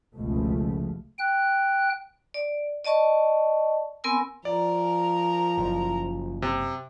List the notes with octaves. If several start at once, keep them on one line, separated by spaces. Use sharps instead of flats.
F1 C#2 B2 F3 A3
G5 F#6
D5
D5 D#5 A5 C#6
B3 C4 A#4 G#5 E6
F3 A#4 D5 A#5
F#1
C3